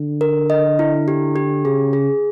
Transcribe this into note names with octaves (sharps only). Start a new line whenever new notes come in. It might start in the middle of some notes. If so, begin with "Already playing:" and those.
Already playing: D3
A#4
D#5
E4
G4
G4
C#3 G#4
G#4